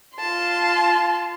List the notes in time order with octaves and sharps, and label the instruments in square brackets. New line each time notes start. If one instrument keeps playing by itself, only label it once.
[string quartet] F4 A5 C6